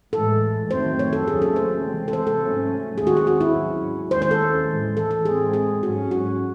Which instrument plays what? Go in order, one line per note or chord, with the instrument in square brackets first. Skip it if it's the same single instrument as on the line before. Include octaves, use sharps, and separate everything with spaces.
[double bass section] A2 E3 G#3 [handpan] A4
[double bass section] F#2 D#3 F#3 A3 C4 [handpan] C5
[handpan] C#5
A4
[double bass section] D#2 C#3 F#3 A3 C#4 [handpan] G#4
[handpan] A4
C5
[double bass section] C3 E3 G#3 C4
[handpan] A4
C5
A4
[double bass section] G#2 F#3 A3 C#4
[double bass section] D#2 D#3 G#3 C4 [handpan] G#4
[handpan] F#4
G#4
F#4
E4
[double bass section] G#2 F#3 C#4
[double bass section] D#2 D#3 G#3 C#4 [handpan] C5
[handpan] C5
A4
[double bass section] A2 E3 G#3
[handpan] A4
A4
[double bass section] A2 G#3 C4 [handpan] G#4
[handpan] G#4
[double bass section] G#2 F#3 C#4 [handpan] F#4
[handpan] F#4